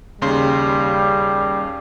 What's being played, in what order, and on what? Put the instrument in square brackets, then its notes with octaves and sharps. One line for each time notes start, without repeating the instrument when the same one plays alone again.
[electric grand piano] D#2 C#3 C6 [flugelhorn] G3